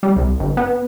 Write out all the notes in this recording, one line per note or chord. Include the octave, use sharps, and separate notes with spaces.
G3
C2
G1
B3